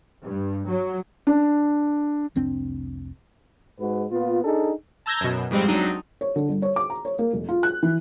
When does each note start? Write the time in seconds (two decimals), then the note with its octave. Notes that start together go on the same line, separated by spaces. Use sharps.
0.24 G2
0.69 F#3
1.27 D4
2.36 F1 C2 C4 D4
3.80 G#2 G#3 F#4 B4
4.11 A#2 B3 F4
4.44 D4 D#4 G#4 A4
5.06 A5 A#5 E6 G6 G#6 A#6
5.21 F#2 B2
5.51 F2 G#2 G3 G#3 C4
5.68 G#1 F#3 C4 D4 D#4
6.21 C#5
6.36 D3
6.49 G1
6.62 C#5
6.76 D6
6.90 A#5
7.05 C#5
7.19 A#3
7.33 F1
7.49 F4
7.63 F#6
7.83 E3